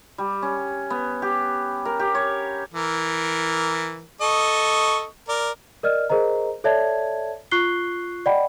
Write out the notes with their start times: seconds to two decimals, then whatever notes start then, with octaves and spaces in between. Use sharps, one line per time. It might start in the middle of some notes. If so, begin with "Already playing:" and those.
0.18 G3
0.42 C#4
0.90 B3
1.22 G4
1.85 A#4
1.99 G4
2.15 C#5
2.74 E3 A#4
4.21 A4 D#5 C#6
5.29 A#4 D5
5.83 A#4 D5 D#5 F6
6.10 G#4 A#4 C5 D#5 A#5
6.64 A4 C#5 D5 E5 A5 G#6
7.51 F4 C#6 F#6 C7 G7
8.26 D5 D#5 F#5 G5 B5